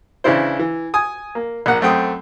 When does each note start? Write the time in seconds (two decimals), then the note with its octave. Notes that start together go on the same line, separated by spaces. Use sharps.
0.24 C#3 E3 D4 E4 C5
0.59 E3
0.94 G#5 D#6
1.35 A#3
1.66 A#1 A#3 F#5
1.81 F#2 A3 C4 G5 D#6